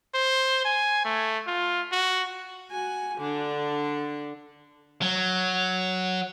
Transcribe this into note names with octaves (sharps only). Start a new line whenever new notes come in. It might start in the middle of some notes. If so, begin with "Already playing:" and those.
C5
G#5
A3
F4
F#4
F#4 G#5
D3 D4
F#3